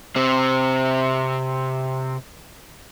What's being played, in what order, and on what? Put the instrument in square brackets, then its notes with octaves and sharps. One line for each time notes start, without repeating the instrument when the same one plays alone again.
[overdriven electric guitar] C3 C4